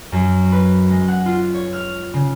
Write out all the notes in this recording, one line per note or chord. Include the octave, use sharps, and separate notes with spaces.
F#2
B4
G#3
F#5
F4
C#5
F6
C#3